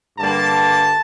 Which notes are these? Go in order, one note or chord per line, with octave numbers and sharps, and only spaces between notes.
G2 D3 G3 A#3 A5